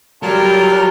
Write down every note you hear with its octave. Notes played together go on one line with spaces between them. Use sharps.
F#3 G3 F4 A4 A#4